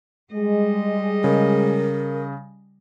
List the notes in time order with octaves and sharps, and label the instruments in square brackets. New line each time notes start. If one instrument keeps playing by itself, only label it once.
[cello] G3 D#5 [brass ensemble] G#3
[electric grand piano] C#3 [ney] A#4